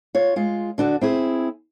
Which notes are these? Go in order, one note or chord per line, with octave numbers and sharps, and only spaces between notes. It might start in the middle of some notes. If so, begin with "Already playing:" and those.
F4 C#5
G#3 F4
D3 D4 F#4
C4 E4 G#4